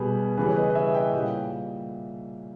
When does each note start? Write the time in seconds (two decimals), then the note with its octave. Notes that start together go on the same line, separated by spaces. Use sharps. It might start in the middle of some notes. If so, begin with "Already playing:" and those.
Already playing: B2 G3 G#4 B4
0.37 C#3 E3 G3 G#4 B4
0.47 C#5
0.56 B4 D#5
0.70 D#5
0.75 C#5 E5
0.94 D#5 G5
1.13 A#2 G3